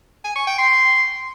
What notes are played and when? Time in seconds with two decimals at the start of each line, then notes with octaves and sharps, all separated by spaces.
0.24 G#5
0.36 C#6
0.47 G5
0.58 C6